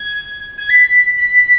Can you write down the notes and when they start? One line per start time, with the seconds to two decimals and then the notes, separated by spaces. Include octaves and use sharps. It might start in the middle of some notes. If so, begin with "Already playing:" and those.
Already playing: G#6
0.58 G#6
0.69 B6
1.18 B6